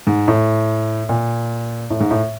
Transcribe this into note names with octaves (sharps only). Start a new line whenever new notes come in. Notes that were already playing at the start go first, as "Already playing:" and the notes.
G#2
A2
A#2
A2
G#2
A2